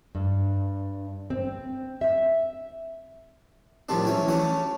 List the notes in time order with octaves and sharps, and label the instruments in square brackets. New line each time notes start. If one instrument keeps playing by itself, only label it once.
[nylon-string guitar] G2
C4
E5
[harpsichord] A2 D#3 F3 G3 C4 D4
E3 F#3 C#4 E4 C#5
A3 C#4 D4 F#4 C#5 F#5